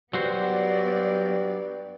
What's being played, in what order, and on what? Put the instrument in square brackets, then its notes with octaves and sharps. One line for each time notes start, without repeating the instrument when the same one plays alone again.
[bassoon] G2 [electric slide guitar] F#3 F#4 C5 [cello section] B3 D5 [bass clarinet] G4